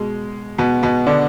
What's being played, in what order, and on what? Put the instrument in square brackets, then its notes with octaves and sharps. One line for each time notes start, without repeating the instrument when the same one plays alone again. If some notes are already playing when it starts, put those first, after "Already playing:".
Already playing: [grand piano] B2 G#3
B2 B3
B2 B3
D3 D4